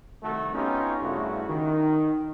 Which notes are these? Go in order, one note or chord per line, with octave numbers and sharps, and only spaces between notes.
C2 D#3 A3 F#4 A4
B3 C#4 D#4 F4 G4
G2 C#3 A3 E4 F#4
D#3